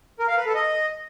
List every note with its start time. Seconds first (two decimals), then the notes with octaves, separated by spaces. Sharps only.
0.19 A#4
0.28 F5
0.37 B4
0.46 A4
0.54 D#5